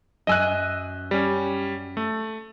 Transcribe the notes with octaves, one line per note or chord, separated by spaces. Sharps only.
F#2 D#5 G#5 E6 F#6
G3 C#4
A3